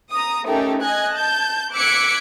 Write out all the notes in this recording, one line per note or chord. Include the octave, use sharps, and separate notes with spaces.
A#5 D#6
A3 C#4 D#4 G4 A4 A#4
D#5 G#5 F#6 G#6
A5 G6
D6 E6 F#6 G#6 B6 C#7